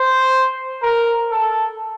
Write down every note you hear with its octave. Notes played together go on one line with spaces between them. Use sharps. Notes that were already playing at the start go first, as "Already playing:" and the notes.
Already playing: C5
A#4
A4